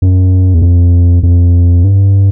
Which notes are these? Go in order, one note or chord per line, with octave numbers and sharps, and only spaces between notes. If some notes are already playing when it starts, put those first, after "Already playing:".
F#2
E2
F2
F2
G2